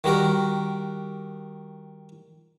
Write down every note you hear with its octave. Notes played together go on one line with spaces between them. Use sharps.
D#3 G3 F#4 A#4